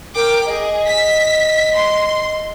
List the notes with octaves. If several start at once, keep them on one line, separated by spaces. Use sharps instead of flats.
A#4 G5 D6
G#4 D#5
B6
C6